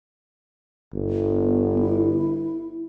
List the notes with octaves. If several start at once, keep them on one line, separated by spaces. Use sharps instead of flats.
G1
B3
E4